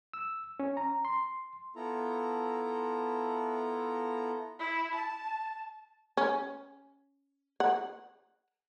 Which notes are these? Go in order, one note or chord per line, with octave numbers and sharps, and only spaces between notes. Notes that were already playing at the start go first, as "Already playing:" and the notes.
E6
C#4
A#5
C6
B3 E4 F4 A4 A#5
E4
A5
C#4
F#5